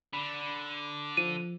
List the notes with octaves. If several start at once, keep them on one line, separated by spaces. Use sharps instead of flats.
D3 B5
F3 D#7